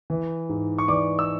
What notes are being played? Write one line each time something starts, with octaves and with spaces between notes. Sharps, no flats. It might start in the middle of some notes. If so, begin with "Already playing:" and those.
E3
G#2
C#6
E3 D5 D6
E6